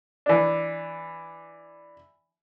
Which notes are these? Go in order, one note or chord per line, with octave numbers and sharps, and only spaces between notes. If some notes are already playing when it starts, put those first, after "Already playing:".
E3 D4